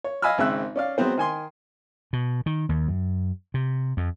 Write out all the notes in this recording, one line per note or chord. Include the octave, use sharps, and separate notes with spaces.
C#5
D#5 F5 G#5 B5 E6 F6
G#1 C#3 C4 E5 E6 F#6
C#4 D5 F5
F#3 G#3 B3 C4 C5
D#3 G#5 C6
B2
D#3
D#2
F#2
C3
F2